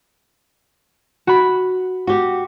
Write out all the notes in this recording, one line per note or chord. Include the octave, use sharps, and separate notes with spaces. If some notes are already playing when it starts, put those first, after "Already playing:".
F#4 B5
F#4 G4